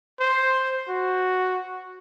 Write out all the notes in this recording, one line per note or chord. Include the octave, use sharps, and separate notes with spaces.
C5
F#4